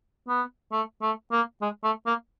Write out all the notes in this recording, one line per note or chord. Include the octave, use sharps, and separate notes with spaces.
B3
A3
A3
A#3
G#3
A3
A#3